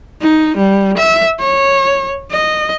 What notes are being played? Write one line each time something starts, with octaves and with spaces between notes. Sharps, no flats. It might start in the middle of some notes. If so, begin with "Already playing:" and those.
D#4
G3
E5
C#5
D#5